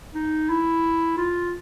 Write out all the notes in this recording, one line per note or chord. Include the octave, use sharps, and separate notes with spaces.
D#4
E4
F4